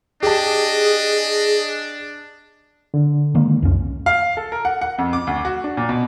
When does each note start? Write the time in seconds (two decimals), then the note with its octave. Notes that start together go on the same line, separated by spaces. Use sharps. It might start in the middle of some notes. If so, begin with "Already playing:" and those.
0.23 D4 G4 G#4 D#5 A5
2.94 D3
3.35 D#3 G#3 A#3
3.62 C2 F2 C#4
4.06 F5
4.37 A4
4.52 A#4
4.65 F#5
4.81 F#5
4.98 F2
5.13 D6
5.27 D2
5.45 F#4
5.64 D4
5.77 A#2
5.89 B2